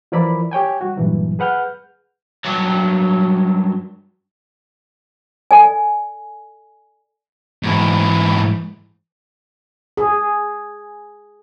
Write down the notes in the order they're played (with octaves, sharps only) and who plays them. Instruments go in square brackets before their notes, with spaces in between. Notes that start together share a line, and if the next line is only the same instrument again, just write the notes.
[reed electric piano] E3 F3 E4 A#4 D5 B5
G4 C#5 G5 G#5
G3 F#4
G2 A#2 E3 F#3
G#4 B4 F#5 F6 G6
[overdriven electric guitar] G2 F#3
[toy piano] A4 D5 G#5
[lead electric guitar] G#2 E3
[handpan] G#4